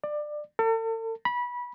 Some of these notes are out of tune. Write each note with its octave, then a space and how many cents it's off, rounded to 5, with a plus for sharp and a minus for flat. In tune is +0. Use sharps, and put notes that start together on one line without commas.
D5 +20
A4 +40
B5 -20